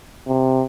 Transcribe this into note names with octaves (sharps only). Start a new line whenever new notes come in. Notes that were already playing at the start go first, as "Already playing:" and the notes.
C3